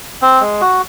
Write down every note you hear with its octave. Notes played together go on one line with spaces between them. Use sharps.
C4
G#3
F#4